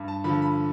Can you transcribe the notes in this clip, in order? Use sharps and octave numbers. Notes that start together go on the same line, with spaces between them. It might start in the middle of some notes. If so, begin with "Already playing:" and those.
Already playing: G2
A5
D3 F3 B5
B5